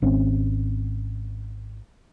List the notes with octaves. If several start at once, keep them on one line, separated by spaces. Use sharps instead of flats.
G#1 C4 C#4